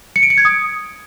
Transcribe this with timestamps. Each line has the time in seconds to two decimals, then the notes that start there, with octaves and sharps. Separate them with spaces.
0.16 C#7
0.23 D7
0.30 C#7
0.38 G#6
0.45 D#6